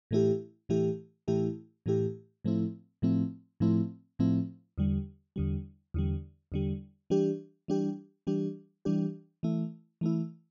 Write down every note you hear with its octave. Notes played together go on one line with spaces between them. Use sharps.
A2 E3 A3 E4 G4
A2 E3 A3 E4 G4
A2 E3 A3 E4 G4
A2 E3 A3 E4 G4
A2 F3 A3 C4 E4
A2 F3 A3 C4 E4
A2 F3 A3 C4 E4
A2 F3 A3 C4 E4
E2 D3 G3
E2 D3 G3
E2 D3 G3
E2 D3 G3
E3 G3 D4 G4
E3 G3 D4 G4
E3 G3 D4 G4
E3 G3 D4 G4
E3 A3 E4
E3 A3 E4